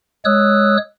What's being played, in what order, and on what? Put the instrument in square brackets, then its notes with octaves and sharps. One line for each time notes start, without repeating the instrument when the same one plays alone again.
[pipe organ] G#3 C#5 D#6 E6 F#6